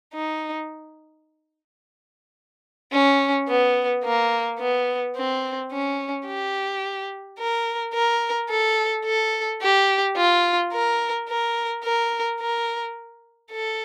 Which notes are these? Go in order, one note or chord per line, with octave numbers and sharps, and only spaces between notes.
D#4
C#4
B3
A#3
B3
C4
C#4
G4
A#4
A#4
A4
A4
G4
F4
A#4
A#4
A#4
A#4
A4